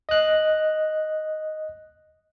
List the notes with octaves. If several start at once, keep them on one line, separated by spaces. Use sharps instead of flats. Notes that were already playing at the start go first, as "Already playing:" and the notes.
D#5 F#6